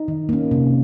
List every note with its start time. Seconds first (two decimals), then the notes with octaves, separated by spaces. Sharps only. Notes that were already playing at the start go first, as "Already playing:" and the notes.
Already playing: D#4
0.08 D#3
0.29 A#3 C#4
0.51 C3